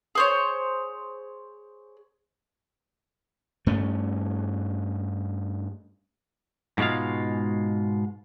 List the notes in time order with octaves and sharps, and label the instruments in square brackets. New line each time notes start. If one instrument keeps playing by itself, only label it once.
[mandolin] G#4 C5 C#5
[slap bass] G2 A3 C#4
[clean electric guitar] G#2 B2 G#3 F4 F5